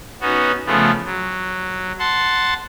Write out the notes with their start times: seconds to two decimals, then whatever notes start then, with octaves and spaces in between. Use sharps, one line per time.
0.21 B3 C#4 D#4 F#4
0.66 C#3 F3 A3 B3
1.06 F#3
1.99 F#5 A5 C6